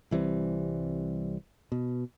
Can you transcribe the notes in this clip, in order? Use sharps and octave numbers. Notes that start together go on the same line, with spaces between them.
C2 E3 G3 C4
B2